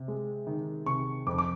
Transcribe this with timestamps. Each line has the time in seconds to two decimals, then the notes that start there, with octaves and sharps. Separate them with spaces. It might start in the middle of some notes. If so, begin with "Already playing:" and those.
Already playing: C3
0.08 G#3
0.47 D#3
0.86 C3 C#6
1.27 F2 D6
1.38 D6